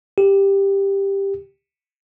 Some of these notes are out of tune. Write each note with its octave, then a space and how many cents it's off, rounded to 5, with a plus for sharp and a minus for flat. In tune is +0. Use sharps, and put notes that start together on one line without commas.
G4 +10